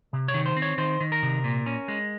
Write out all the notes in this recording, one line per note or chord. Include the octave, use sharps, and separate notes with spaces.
C3
C#5
D#3
C5
C4
C#5
D#3 C5
D#3
A#4
C3
A#2
C#4
G#3